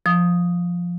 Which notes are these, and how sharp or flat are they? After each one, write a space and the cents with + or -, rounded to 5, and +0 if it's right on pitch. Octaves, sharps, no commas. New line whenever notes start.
F3 +0 D#6 +0